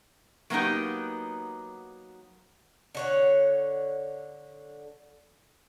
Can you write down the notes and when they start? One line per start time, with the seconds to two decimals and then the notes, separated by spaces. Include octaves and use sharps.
0.50 F#3 A#3 B3 C#4 D#4 G4
2.95 D3 C#5 F#5